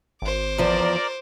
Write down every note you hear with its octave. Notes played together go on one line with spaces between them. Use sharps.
G#1 C5 D6
E2 F3 A#4 D5